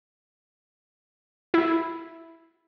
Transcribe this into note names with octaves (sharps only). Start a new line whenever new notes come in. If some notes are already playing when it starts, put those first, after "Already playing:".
E4